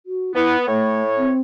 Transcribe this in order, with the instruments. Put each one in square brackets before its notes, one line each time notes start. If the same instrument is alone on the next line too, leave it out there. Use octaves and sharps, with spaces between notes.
[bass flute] F#4
[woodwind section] B3 [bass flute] E4
[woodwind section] A2 C#5 [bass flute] A3
[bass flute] C4